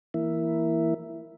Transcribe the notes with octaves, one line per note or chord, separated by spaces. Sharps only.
E3 A#3 E4